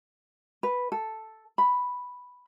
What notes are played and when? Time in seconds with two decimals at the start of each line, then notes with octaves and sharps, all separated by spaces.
0.63 B4
0.92 A4
1.58 B5